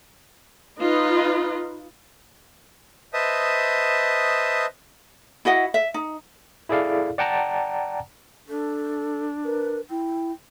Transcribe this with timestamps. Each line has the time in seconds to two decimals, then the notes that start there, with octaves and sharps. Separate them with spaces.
0.78 D#4 F4 B4 D#5
3.13 B4 C5 D#5 E5 A5 D#6
5.45 E4 F#4 D#5 F#5
5.74 E5
5.94 D#4
6.69 E4 G#4 A4 D5 F5
7.18 D5 F#5 G5 A5 A#5
8.49 D4 A4
9.45 A#4 B4
9.90 E4 G5